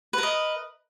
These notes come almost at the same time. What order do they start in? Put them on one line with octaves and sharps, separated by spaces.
B4 A#4 D#5